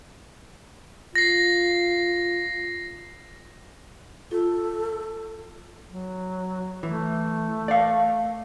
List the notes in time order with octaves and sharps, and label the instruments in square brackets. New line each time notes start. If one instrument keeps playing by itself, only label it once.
[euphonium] F4 [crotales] A#6 C7
[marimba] F4 [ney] A4
[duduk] F#3
[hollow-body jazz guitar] E3 [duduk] A3
[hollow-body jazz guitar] D5 F5